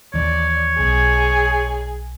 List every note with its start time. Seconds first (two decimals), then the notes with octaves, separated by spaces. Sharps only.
0.14 D#2 E3 C#5 D5
0.79 B1 G#4